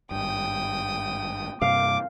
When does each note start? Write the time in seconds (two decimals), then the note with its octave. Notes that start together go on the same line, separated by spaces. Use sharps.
0.11 G#1 G2 G5 D#6
1.62 G2 C3 A#3 F5 D6